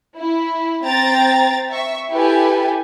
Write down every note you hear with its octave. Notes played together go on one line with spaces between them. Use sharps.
E4
C4 G5 A#5 A6
E5 C#6
E4 G4 A4 B4 G#5